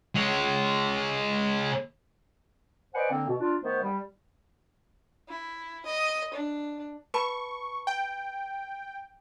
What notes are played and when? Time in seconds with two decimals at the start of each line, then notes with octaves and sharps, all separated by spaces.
0.15 G#3 C#5
2.95 B4 C5 D5 D#5 F#5 G#5
3.11 D3 A#3 C4
3.27 B2
3.40 D4 F4
3.62 D#3 A3 B3 C5
3.82 G3
5.28 E4
5.86 D#5
6.34 D4
7.14 B4 A5 B5 C#6
7.87 G5